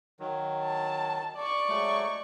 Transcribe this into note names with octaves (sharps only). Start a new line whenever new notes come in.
D#3 F#3
A5
D5 C#6
F#3 G#3 A3